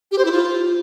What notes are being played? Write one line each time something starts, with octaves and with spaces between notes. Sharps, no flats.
G4
C5
E4
F4